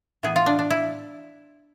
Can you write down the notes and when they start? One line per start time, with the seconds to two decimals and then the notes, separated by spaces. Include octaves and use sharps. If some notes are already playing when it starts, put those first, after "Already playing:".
0.23 A2 E3 B3 G#4
0.36 F4
0.46 D4
0.59 D4
0.70 E4